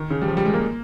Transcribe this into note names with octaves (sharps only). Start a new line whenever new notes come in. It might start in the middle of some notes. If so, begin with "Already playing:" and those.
Already playing: D#3
C#3
G3
F3
G3
G#3
A#3